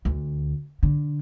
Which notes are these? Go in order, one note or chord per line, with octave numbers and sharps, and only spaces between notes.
D2
D3